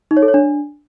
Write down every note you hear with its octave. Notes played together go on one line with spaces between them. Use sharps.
D#4
C#5
A4
C#5
D4